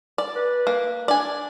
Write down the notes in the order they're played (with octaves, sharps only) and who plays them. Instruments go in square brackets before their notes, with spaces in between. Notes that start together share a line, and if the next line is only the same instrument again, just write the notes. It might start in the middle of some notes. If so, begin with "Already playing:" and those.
[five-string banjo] D5
[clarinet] B4
[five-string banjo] A#3
[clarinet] D4 [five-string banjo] D5 G#5